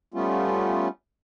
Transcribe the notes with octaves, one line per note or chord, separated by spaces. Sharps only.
G3 A3 B3 C#4 F4